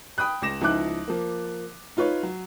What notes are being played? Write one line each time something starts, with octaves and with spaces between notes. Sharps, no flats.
G5 B5 D#6 F#6
C#2 D6 A#6 E7
C#2 F3 D#4 E4 D6 F#6
F3 A#3
D#4 F4 B4 C#5
F#3